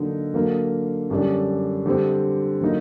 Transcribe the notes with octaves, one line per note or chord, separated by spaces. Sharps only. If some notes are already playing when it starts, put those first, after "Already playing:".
Already playing: D3 F#3 A#3 D#4
D3 F#3 A#3
F#2 D3 G3 D4
D3 G3 C4
D3 F#3 A#3 D#4